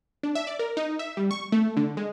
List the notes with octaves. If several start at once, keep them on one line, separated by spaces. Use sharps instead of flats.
D4
E5
D5
A#4
D#4
E5
G3
C#6
A3
D3
G#3